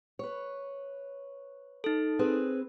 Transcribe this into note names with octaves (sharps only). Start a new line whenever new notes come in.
B4 C#5
D#4 A4
C4 G#4 B4